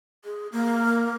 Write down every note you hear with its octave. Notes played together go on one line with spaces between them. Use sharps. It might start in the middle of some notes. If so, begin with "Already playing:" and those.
G#4
A#3